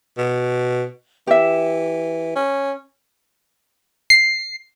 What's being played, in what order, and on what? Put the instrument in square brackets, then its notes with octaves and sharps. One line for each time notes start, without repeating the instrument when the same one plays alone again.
[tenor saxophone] B2
[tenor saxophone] E3 [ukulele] G4 E5
[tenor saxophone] C#4
[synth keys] C7